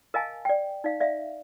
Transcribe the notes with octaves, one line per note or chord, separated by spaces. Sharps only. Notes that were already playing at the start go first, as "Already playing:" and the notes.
A#4 D#5 F5 G#5 A5
D5 G5
D#4 D5 F5
D5 E5 F5